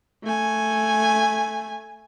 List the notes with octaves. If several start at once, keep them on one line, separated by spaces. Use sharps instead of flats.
A3 G#5